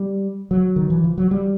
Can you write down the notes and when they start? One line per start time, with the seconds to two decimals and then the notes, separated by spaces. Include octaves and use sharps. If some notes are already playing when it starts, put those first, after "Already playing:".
Already playing: G3
0.51 F#3
0.76 D#3
0.90 E3
1.04 F3
1.18 F#3
1.31 G3